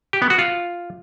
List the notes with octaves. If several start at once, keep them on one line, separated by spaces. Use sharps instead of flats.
G4
B3
F#4
F4